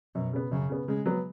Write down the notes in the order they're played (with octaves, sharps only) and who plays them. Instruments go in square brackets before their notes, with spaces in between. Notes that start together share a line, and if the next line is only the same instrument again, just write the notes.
[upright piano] F#2 [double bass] B2
[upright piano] C#3 B3
[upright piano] F#2 [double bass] C#3
[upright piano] C#3 B3
[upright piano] C#3 [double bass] G#3
[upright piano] F#3 B3